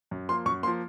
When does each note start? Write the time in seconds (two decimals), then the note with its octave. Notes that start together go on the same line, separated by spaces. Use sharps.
0.11 F#2
0.29 F3 A#3 C6
0.46 F#2 C#6
0.63 A#3 C6
0.67 F3